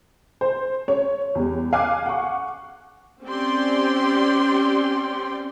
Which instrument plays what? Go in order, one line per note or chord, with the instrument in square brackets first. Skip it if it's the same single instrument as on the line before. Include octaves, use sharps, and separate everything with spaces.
[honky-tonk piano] C5
C#5
E2 G3
F5 G#5 D6 F#6
F#5 C#6
[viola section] C4 C#4 G4 D5 G5 C6